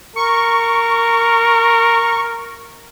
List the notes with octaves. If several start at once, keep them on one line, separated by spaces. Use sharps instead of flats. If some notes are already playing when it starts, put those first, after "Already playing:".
A#4 C#6